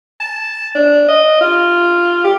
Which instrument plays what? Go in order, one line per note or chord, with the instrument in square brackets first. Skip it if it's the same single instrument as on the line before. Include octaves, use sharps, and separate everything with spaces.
[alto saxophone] A5
D4
D#5
F4
G4